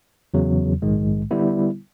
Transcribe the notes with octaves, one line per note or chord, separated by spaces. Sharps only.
E2 C#3 F#3
A#1 G#2 D#3 G#3
D3 G3 B3 E4